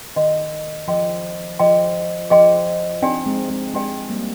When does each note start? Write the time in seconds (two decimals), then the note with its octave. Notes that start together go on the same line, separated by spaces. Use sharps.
0.16 D#3 G#4 D#5 G5 C6
0.88 F3 G#4 D#5 G5 C6
1.59 F3 G#4 D#5 G5 C6
2.30 F3 G#4 D#5 G5 C6
3.02 C4 D4 D#4 G4 D5 G5
3.26 G#3 C4
3.50 G#3 C4
3.74 G#3 D4 G4 D5 G5
4.09 G3 A#3